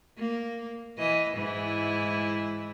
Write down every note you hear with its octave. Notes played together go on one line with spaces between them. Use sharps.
A#3
E3 D#5
G#2 E3 E4